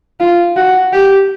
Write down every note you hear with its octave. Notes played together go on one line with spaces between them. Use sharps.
F4
F#4
G4